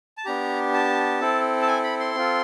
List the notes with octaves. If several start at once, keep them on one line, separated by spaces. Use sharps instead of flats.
A5
B3 D4 G4 A#5
A5
C4 E4 A4
A5
G#5
B5
C6
C4 F4 A4